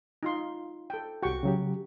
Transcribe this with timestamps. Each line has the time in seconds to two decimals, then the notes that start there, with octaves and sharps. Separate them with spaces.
0.23 D#4 F4 C6
0.90 A4 G5
1.23 C2 F#4 G4 G5 C#6
1.43 C#3 F#3 G4